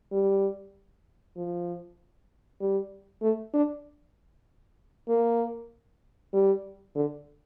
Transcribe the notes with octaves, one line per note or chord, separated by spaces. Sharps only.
G3
F3
G3
A3
D4
A#3
G3
D3